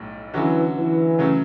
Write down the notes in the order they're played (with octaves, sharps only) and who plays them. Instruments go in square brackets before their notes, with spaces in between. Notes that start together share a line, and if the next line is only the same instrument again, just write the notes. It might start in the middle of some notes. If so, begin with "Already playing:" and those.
Already playing: [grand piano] B1 A2 G3
[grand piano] D3 F#3 C#4 F#4 [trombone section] E3
[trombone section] E3
[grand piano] C#3 F#3 A3 C#4